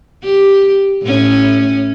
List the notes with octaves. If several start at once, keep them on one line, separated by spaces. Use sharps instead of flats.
G4
A2 C#4